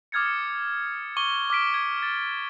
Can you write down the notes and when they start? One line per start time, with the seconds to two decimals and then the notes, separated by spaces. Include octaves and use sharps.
0.12 D6 D#6 F6 G#6 A6 C#7
0.26 C#7
1.17 C#6 D6 G7
1.50 D6 F6 B6 D7
1.74 G#6 B6
2.03 A6